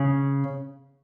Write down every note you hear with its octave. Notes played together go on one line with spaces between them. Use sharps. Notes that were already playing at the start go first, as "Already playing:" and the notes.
Already playing: C#3